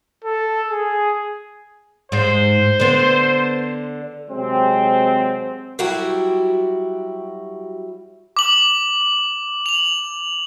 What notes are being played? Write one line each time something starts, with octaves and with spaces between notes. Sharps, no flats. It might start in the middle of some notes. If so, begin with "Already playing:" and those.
A4
G#4
G#2 G#3 C5
D3 B3
C3 F#3 G#3 C4
F#3 G3 E4 F#4 G4
D6 F#7
F7 F#7